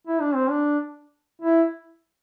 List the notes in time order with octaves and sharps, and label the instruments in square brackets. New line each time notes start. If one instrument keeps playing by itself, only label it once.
[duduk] E4
D4
C4
D4
E4